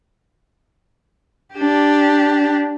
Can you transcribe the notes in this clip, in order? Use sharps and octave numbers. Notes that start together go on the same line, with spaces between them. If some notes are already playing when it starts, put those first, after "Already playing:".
D4 G4